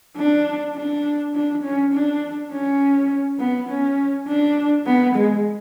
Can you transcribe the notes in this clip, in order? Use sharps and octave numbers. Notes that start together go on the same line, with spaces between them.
D4
D4
D4
C#4
D4
C#4
B3
C#4
D4
B3
G#3